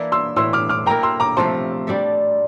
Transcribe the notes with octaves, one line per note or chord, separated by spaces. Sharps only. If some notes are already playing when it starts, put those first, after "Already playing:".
Already playing: E3 A#3 D4 E4 A4
C6 E6
A2 E3 A3 C6 E6
D6 F6
D6 F6
A#3 E4 A#4 G5 A#5
C6 E6
A#5 D6
C3 F3 A3 A5 C6
G3 D4 A4 E5